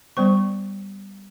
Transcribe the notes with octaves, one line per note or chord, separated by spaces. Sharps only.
G3 B3 C5 C#6